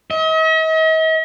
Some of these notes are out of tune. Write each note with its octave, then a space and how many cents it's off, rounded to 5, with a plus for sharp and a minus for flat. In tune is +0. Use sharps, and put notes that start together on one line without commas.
D#5 +45